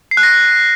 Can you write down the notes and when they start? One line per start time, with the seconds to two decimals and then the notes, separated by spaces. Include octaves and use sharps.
0.11 C7
0.17 F#6
0.23 A#6